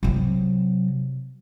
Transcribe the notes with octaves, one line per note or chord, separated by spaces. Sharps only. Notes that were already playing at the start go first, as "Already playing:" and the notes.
C3 F#3